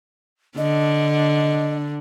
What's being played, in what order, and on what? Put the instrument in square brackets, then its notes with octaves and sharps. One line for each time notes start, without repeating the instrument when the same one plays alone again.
[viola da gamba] D3 D4 [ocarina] D#5